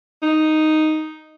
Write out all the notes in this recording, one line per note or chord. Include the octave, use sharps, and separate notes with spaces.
D#4